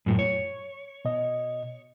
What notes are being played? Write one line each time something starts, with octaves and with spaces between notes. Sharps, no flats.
F#2 A2
C#5
B2 D#5